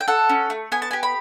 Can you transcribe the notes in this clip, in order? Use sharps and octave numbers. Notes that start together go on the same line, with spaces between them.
G5
A4 F#5
C#4
A3
B3 G#5
A5
G4 G#5
B5